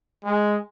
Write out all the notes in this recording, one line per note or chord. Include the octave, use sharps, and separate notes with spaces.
G#3